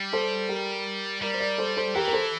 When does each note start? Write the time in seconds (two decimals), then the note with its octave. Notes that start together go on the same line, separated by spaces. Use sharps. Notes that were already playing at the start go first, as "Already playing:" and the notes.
Already playing: G3
0.13 A4 C5
0.49 G4 A#4
1.22 G3 A#4 D5
1.34 C5
1.40 A#4 D5
1.58 A4 C5
1.77 A4 C5
1.95 E3 G4 A#4
2.08 A#4
2.13 A4 C5